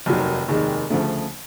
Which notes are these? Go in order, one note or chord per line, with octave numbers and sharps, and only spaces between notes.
F1 D#2 D#3 F#3
F1 D#2 D#3 G#3
D2 C#3 F3 A3